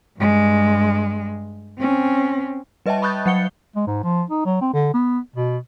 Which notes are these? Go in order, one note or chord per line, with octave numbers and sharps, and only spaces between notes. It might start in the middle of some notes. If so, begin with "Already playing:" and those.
G2 G#3
C4 C#4
G3 B4 D#5 E5 G5 A5
B5 C#6 D#6 F#6 G6 A6
F#3 F#5 C#7 G7
G#3
G#2
F3
D#4
F#3
C4
D3
B3
B2